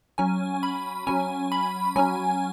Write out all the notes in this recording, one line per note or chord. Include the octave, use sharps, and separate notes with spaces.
F#3 C#4 G#5
B5
F#3 C#4 G#5
B5
F#3 C#4 G#5